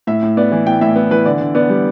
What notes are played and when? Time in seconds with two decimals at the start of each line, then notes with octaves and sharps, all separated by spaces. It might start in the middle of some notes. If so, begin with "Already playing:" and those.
0.07 A2 E5
0.23 A2
0.37 B3 D5
0.52 E3
0.66 A2 G5
0.81 A2 E5
0.96 B3
1.11 E3 B4
1.25 D3 D5
1.41 D3
1.55 B3 D5
1.70 G3